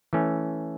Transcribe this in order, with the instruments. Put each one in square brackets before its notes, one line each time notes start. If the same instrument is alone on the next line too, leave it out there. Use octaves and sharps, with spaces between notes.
[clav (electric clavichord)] E3 A3 C#4